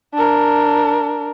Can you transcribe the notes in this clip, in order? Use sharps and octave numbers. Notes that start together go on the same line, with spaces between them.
D4 A#4